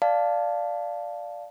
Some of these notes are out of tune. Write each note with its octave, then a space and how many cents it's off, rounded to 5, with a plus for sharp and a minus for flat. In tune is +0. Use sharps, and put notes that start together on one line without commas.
D5 +0 F5 +0 A5 +0